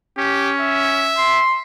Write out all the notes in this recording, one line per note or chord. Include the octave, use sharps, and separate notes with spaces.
C#4 G4
E5
C6